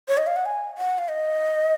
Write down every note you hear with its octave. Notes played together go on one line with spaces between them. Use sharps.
C#5
D#5
F5
F#5
G#5
F#5
F5
D#5